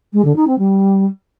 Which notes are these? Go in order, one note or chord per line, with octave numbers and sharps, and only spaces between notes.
G#3
D3
D#4
C4
G3